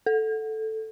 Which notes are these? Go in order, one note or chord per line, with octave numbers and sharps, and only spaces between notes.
A4